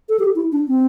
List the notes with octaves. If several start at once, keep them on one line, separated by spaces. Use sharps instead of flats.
A4
G4
E4
D4
C4